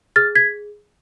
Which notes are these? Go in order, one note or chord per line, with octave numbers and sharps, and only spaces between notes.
G#4 F6 A6
G#6 B6